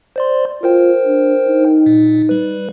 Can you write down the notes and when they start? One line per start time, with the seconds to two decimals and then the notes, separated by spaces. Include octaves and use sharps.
0.16 C5 D5 C6
0.63 F4 A#4 C5 G5
1.05 D4
1.49 D#4
1.86 A#2
2.29 G3 B4